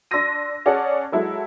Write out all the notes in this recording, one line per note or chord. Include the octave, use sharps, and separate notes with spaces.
D4 C6 E6 A6 A#6 D#7
C#4 G#4 D5 F#5 A5
F#3 G#3 E4 A4 E5